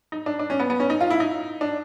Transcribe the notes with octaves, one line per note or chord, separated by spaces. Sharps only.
D#4
D4
D4
C#4
B3
B3
C#4
D#4
F4
E4
D#4
D4